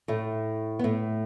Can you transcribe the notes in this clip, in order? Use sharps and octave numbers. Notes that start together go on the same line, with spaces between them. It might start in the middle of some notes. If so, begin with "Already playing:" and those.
A2 A3
B3
A2 A3